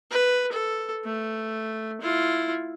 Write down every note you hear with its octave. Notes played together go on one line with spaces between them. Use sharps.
B4
A4
A3
E4 F4